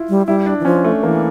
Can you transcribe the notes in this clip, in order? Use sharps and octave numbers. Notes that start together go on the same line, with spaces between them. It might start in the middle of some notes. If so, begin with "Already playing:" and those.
Already playing: E4 F4
G3
G3 E4
D4
E3
F3 C#4
A3
E3 A#3